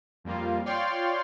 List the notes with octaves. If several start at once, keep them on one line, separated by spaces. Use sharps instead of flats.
F2 G3 A#3 F4
F4 C#5 D5 G5 C6 F6